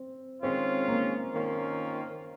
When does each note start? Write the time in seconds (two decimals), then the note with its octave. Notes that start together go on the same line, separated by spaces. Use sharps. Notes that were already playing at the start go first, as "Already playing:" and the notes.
Already playing: C4
0.43 D#3 G#3 C4 C#4 F4
0.88 A#3
1.33 D#3 A#3 C#4 F4